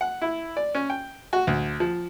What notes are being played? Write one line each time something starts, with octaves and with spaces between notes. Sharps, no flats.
F#5
E4
D5
C#4
G5
F#4
D2
F3